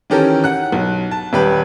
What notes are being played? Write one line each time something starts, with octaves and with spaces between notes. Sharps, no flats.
D#3 E3 C#4 G4 A4 A#4
F#5 F#6
B1
A5
D#1 G4 B4